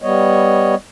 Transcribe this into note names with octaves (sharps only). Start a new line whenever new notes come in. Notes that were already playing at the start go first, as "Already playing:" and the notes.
G3 B3 C#5 D#5